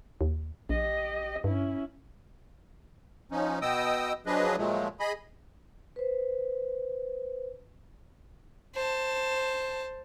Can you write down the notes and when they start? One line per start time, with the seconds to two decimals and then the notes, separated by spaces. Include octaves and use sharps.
0.21 D#2
0.69 A#1 G4 D#5
1.44 G2 C#4 E4
3.32 F3 C#4 D#4
3.62 B2 B3 D#5 G5 D#6 E6
4.26 F3 F#3 D4 G#4 B4 D#5
4.58 A#2 F3 F#3 G#3 A3
5.00 G#4 D#5 B5
5.96 B4 C5
8.75 C5 A5